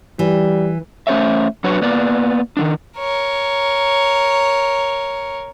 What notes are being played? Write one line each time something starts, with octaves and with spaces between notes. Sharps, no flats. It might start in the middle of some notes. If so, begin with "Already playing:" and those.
E3 G3
A3 C#4 C5 C#5 E5
F#3 D4 F#4 B4 C#5
A#3 B3 D5
D#3 E3 D4
A#4 C#5